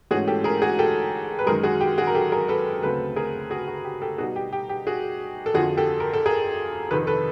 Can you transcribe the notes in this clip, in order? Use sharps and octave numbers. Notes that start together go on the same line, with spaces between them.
G#2 E3 A3 C#4 F#4 G#4
G4 A4
G#4 A#4
F#4 G#4
G4 A4
B4
F#2 D#3 G#3 G#4 A#4
F#4 G#4
G4
F#4 G#4
A#4
G4 A4
G#4 A#4
A4 B4
D2 C#3 F#3 A3 C4 A4 B4
G#4 A#4
F#4 G#4
F#4
G4
G4 A4
B2 G3 B3 D#4 F#4 G#4
G4
G4
G4
F#4 G#4
A4
F2 D3 F3 F#4 G#4
G4 A4
A#4
A4
G#4 A#4
F2 C3 D#3 A4 B4
A4 B4